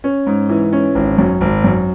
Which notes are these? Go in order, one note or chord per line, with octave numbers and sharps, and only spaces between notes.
C#4
G#2
E3
C#4
G#1
F#2
G#1
F#2